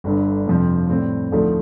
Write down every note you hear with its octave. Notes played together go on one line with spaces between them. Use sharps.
G1 G2 D3
F2 C3 F3 C4
A2 G3 C4
D2 D3 F3 A3 D#4